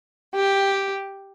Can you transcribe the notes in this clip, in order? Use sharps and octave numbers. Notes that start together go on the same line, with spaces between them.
G4